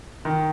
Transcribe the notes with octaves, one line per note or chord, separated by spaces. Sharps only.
D#3